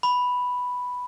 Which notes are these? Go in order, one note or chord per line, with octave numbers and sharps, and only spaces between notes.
B5